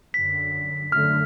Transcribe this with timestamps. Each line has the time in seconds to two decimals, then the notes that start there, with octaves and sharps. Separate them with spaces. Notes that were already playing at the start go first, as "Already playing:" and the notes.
0.14 F#2 D3 B6
0.92 F#2 D3 A3 F6